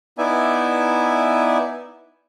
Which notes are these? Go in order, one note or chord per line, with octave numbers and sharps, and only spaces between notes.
B3 D#4 E4 D5 E5 G#5